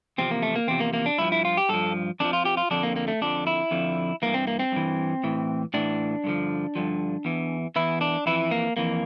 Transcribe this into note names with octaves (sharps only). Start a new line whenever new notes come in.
E2 C3 F3 C4
A#3
A3
A#3
E2 C3 F3 C4
A#3
A#3
D4
G2 F3 E4
E4
F4
G4
G2 F3 A4
F2 D3 F3 D4
F4
G4
F4
F2 D3 F3 D4
A#3
A#3
A3
F2 D3 F3 D4
E4
F2 D3 F3
G2 E3 A#3
C4
A#3
C4
G2 E3
A2 E3
A2 E3 D4
G2 D3 F3
G2 D3 F3
E2 E3
E2 E3 E4
D4
F2 E3 E4
A#3
F2 E3 A#3